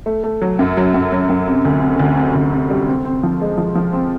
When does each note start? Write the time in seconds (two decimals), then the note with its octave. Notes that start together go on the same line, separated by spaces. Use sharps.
0.06 A3
0.24 A3
0.42 F#3
0.59 F#2
0.77 F#3
0.94 F#2
1.12 F#3
1.29 F#2
1.48 C3
1.65 D2
1.82 C3
1.99 D2
2.17 C3
2.35 D2
2.53 C3
2.70 G3
2.88 C4
3.05 C4
3.23 F3
3.41 G#3
3.58 F3
3.75 F3
3.93 C4